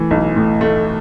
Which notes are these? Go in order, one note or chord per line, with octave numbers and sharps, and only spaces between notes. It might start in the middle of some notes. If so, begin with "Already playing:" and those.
Already playing: E3 A3
B1
A2
A3